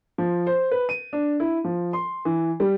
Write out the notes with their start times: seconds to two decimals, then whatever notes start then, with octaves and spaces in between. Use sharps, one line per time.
0.18 F3
0.47 C5
0.71 B4
0.89 D#7
1.13 D4
1.40 E4
1.64 F3
1.93 C6
2.25 E3
2.60 G3